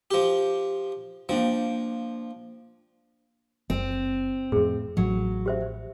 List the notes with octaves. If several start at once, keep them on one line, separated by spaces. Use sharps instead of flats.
F3 G4
F3 A#3 D4 G5
F#1 C4
F2 A2 G#4
A1 A2 F#3
G4 C5 E5